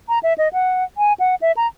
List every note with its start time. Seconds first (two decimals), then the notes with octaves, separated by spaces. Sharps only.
0.09 A#5
0.23 E5
0.38 D#5
0.53 F#5
0.98 G#5
1.20 F#5
1.42 E5
1.57 A#5